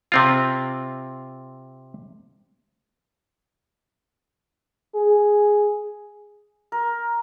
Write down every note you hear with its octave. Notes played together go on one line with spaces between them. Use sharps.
C3 C4 F4
G#4
A#4